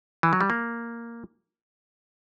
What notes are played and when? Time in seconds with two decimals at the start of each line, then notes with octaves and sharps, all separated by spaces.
0.23 E3
0.33 F#3
0.41 G3
0.50 A#3